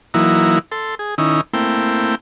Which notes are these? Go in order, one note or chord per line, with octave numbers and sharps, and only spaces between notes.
E3 F#3 A#3 D#4 E4
A4 C6
G#4
D#3 C#4 D#4 E4
A3 A#3 C4 E4 G5